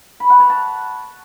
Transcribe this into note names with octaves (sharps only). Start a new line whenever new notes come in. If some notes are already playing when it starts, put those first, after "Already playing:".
B5
F#5
C#5
A5